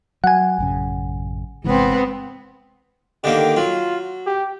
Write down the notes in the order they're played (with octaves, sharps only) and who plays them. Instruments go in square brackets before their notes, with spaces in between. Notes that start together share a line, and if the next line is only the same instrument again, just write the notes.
[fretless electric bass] F#3 [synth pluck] F#5 G#5
[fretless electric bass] A1 F#2 C#3
[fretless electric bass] G1 C3 E3 [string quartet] G#3 B3 C4
[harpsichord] D3 D#3 A#3 [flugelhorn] G4
[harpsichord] F#3 [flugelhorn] F4
[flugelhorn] G4